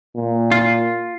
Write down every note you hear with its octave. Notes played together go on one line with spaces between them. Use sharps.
A#2
F4